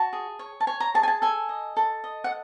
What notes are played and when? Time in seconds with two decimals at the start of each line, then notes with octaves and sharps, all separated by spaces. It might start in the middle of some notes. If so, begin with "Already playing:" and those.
Already playing: F#4 A5
0.13 G#4
0.39 C#5
0.60 A5
0.67 C#5 G#5
0.80 A#5
0.94 G#4 A5
1.03 G#5
1.08 A5
1.22 A4 G#5
1.49 D#5
1.77 A4
2.04 D#5
2.24 F#5